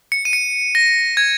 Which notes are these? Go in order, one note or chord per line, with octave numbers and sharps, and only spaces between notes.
C#7
D#7
C#7
A#6
G#6